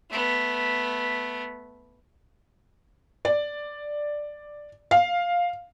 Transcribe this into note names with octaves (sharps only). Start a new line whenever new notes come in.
A3 B3
D5
F5